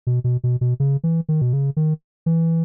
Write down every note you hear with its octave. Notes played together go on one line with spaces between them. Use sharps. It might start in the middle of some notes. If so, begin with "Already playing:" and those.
B2
B2
B2
B2
C#3
E3
D#3
B2
C#3
D#3
E3